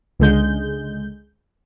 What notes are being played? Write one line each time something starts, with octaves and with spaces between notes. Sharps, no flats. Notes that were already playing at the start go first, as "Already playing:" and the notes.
C#2 D3 G#3 G6